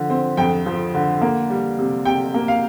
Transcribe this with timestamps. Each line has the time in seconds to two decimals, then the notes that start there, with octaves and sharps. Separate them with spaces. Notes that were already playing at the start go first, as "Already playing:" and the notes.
Already playing: D3 F3
0.10 C4
0.37 F2 G5
0.66 F3
0.94 D3
1.21 A#3
1.50 G3
1.79 C3
2.05 C3 G5
2.34 A#3
2.48 F5